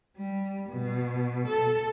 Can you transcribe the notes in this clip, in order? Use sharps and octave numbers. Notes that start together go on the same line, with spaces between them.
G3
B2
A4